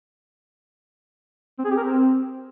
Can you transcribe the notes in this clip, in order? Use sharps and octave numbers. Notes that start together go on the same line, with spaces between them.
C4
G#4
G4
A#4
C4